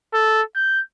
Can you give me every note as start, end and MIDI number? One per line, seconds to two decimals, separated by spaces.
0.14 0.42 69
0.55 0.80 91